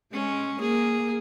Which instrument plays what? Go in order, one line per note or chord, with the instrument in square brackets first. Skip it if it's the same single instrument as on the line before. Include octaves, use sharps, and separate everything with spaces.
[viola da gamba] G#3 [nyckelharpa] C#4
[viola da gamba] A#3 [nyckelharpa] G#4